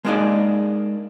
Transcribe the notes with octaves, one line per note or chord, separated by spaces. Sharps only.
G#3 A#3 D4 D#4 G#4 D5